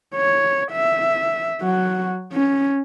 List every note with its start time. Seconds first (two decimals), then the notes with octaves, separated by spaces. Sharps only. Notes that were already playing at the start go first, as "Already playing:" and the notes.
0.16 C#5
0.72 E5
1.61 F#3 F#4
2.33 C#4